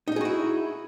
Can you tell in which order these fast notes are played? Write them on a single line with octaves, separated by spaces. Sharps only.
D#4 D#5 G#4 F#4 E4